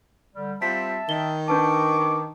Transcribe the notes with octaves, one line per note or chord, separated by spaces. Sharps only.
D3 G3
G3 C4 F4 E5 A5 B6
D#3 G7
D4 B4 A5 C#6 D6